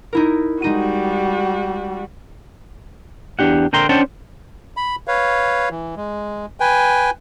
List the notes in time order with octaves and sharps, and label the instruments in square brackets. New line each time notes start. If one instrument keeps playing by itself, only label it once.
[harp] D#4 E4 A#4
[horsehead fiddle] G3 F#4 [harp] G#3 D#4 D#7
[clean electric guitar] E2 D4 G4 F#5
D3 A#4 G5 A#5 C6
C#4 D4 C5 F#5 G5 A5
[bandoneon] B5
B4 C#5 F5
E3
G#3
B4 G5 G#5